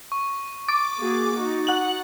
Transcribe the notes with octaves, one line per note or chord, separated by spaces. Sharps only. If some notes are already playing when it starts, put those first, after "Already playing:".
C#6
D6 A6
A#3 F#4 G#4
D#4 F#4
F#5 F#7